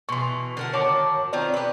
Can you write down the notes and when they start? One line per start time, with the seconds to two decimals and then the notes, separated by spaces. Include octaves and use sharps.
0.09 B2 E3 C6 C#6
0.57 D3 A#4 F#5
0.73 D#3 F#4 C#5 A5 D6
1.33 D#3 C4 F4 D5
1.54 G4 B4